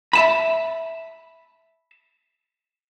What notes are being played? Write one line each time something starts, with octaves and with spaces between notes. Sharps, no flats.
E5 A5 B5